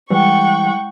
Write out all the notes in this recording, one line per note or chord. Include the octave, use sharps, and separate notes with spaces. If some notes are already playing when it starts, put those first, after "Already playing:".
E3 G3 G#3 E4 F#5 G5 C#6